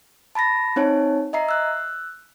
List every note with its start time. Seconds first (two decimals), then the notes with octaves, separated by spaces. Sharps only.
0.35 A5 B5 A6 A#6
0.76 C4 D#4 C#5 A5
1.33 D#5 E5 A#5 C7
1.49 E6 F#6